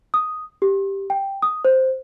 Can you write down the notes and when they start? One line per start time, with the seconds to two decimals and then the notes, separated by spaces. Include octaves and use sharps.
0.14 D#6
0.62 G4
1.10 G5
1.42 D#6
1.65 C5